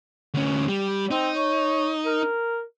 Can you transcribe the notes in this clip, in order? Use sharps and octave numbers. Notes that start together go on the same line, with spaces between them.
D2 C#4
G3
C4 D#4
C#5
A#4